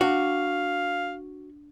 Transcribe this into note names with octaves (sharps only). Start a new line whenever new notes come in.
D4 F#4 F5